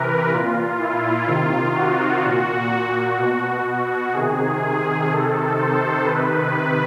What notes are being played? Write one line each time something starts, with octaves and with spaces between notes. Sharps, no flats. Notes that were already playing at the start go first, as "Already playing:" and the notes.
Already playing: C3 E3 A#4 B4
A#2 F4
E4
C3 D#3 F4
F#4
A#2
B2
F#4
C3 D#3 G#4
C3 D#3 A4
C5
C3 D#3 B4